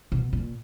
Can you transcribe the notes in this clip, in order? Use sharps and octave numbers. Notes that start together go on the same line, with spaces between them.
B2
A#2